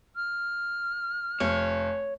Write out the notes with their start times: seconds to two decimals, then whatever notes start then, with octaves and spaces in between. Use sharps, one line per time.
0.16 F6
1.40 F1 C#5